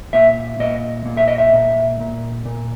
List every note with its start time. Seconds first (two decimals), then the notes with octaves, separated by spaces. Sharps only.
0.13 A#2 E5
0.59 A#2 D#5
1.06 A#2
1.17 E5
1.28 D#5
1.38 E5
1.53 A#2
2.00 A#2
2.46 A#2